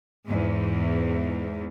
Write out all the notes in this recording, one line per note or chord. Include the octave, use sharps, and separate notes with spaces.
E2 G#2